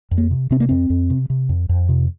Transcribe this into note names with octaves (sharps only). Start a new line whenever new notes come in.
F2
A#3
C3
C3 C4
A#3
F2 C4
F2
C3
C3
F2
F2
C3